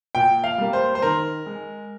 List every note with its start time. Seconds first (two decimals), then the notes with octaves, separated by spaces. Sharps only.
0.15 A#2 G5
0.44 F5
0.58 G3 A#3
0.73 C5
0.95 C5
1.02 D#3 A#4
1.46 G#3